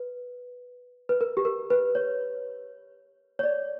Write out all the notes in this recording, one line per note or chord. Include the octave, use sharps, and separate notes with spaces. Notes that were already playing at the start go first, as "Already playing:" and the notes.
Already playing: B4
B4
A#4
G4
A#4
B4
C#5
C#5
D5